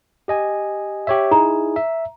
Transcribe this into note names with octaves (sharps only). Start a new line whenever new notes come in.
G4 D#5 G#5
G4 C#5 E5
D#4 E4 G#4 A#5
E5